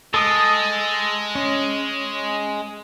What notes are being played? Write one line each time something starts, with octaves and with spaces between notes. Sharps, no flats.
G#3 A4 D#6
C#4